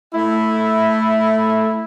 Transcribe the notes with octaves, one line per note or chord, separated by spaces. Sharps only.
A3 E4